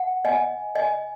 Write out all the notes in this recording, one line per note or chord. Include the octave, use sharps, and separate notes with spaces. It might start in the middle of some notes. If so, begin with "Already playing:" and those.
Already playing: F#5
D#5 G#5
D#5 G#5